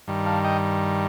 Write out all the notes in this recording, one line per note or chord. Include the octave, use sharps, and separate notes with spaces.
G2 D#3 G3
F5 A5
D#5 G5